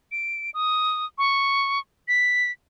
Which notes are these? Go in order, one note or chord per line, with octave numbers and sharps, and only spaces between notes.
D7
D#6
C#6
B6